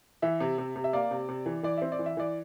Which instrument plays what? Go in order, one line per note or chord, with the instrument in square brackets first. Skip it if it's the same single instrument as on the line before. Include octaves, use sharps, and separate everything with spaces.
[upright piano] E3 E5
C3
C3
C3
E5
A#3 D5
C3
C3
E3
E3 D5
C4 E5
D5
E3
E5
E3 D5